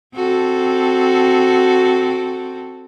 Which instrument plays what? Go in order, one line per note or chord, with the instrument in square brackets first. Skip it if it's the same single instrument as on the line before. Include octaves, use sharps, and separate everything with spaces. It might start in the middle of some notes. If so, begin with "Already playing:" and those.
[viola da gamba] C4 F#4 A4